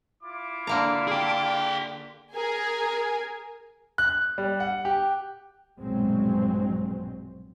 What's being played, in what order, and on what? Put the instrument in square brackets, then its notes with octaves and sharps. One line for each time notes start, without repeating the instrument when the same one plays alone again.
[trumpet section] E4 F4 D6
[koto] D3 A#3 A#5
[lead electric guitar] G#4 G5
[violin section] G#4 A#4 G#5
[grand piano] F#6
G3
F#5
G4
[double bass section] A#1 G2 B2 F#3 G#3 C4